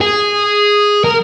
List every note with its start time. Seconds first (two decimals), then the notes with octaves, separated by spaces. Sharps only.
0.01 G#4
1.04 A#4